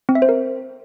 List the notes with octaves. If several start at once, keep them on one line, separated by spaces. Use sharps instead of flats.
C4
E5
C5
A#4